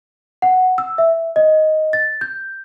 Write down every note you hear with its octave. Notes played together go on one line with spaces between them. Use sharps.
F#5
E6
E5
D#5
A6
G6